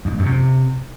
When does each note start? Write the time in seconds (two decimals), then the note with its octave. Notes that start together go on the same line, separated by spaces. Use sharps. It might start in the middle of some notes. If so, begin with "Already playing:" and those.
0.05 F2
0.12 G#2
0.19 F#2
0.26 C3